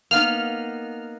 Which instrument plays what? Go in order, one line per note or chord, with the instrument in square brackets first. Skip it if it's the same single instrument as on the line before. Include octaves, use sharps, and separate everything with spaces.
[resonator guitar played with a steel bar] A#3 B3 D#4 [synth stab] F6